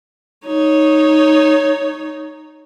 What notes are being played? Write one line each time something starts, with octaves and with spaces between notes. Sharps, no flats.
D#4 C#5